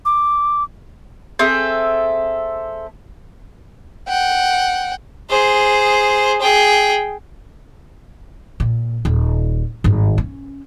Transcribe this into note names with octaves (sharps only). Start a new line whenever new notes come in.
D6
C4 G#4 A4 E5
F#5 G5
G#4 C5
G#4 G5
A#2
D#1
G#1 G2
C#4